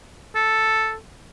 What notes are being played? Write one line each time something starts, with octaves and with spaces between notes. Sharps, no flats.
A4